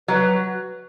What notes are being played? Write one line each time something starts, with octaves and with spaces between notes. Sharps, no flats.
F#3 B4